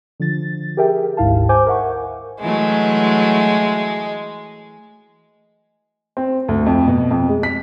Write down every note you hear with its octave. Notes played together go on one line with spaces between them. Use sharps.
D3 F3 A6
G4 G#4 A#4 E5 G5
G#1 D2 G#2 E4 F5 A5
C5 G#5 D6 G6
A#4 E5 F#5 C#6
E3 F#3 G#3 A3
C4
D2
F2
B2
F2
G#3
B6